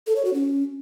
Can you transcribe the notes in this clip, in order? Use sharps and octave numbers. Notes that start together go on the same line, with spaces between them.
A4
C#5
F#4
C#4